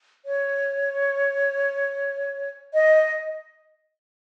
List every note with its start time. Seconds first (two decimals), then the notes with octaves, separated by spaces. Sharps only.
0.25 C#5
2.74 D#5